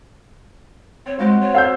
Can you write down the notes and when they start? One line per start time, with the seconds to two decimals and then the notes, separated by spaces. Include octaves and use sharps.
1.06 C4 C#5
1.19 G#3 F4 F#4 C5
1.40 C#5
1.55 F5 E6 G6